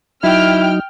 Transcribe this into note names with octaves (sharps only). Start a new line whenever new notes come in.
F#3 D#4 E4 G5 F6